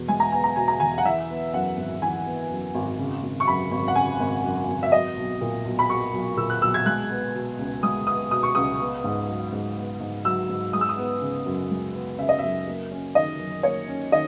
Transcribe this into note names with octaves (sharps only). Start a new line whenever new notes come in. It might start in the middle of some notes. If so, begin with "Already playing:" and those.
Already playing: E2 B2
G#3 G#5
A#5
B3 G#5
A#5
B2 G#5
A#5
E2 G#5
F#5
E3 E5
B3
F#2 F#5
G#1
E3 G#5
B3
F#2
G#1
C#3
G#1
C#6
F#2 B5
G#1
F#5
C#3 G#5
G#1
F#2
G#1
E5
F#3 D#5
B1
A#2
B1
B5
F#3 C#6
B1
A#2 E6
F#6
B1 E6
G#6
G#3 F#6
B3
B2
C#2
G#3 D#6
B3 D#6
B2 D#6
C#6
C#2 D#6
B3
G#2
F#3
G#2
B3
G#2
F#3 E6
G#2
G#3 D#6
E6
D#6
B3
C#3
F#2
G#3
B3
C#3 E5
D#5
F#2 E5
A#3
C#4
D#3 D#5
F#2
A#3 C#5
C#4
D#3 D#5